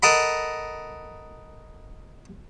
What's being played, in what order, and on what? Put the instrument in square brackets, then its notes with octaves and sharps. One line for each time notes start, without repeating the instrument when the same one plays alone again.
[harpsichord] A4 A#4 D#5 F#5 B5